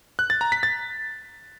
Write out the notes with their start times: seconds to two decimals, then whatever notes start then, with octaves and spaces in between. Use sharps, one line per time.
0.19 F#6
0.30 A6
0.41 A#5
0.52 B6
0.63 A6